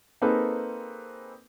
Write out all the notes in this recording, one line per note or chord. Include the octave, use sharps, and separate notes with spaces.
A#3 C4 D#4 G#4 A4 B4